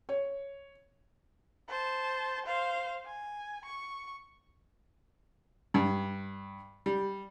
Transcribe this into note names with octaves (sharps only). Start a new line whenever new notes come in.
C#5
C5 A5
C5 F5
G#5
C#6
G2
G3